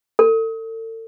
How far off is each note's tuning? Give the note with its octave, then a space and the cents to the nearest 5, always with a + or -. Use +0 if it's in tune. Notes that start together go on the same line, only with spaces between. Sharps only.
A4 +40